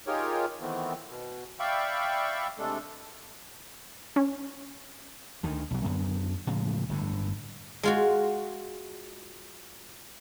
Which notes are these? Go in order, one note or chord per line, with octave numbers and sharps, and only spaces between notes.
D#4 F4 G4 G#4 A#4 C#5
D#3 E3 A3 B3 C4
B2
D5 E5 F5 G5 B5 C#6
C3 G#3 A3 D4 A4
C#4
D2 D#3
B1 F#3
F#2 D3 B3
A2 C#3 F3 G#3
G1 A2 D3
G#3 F4 F#4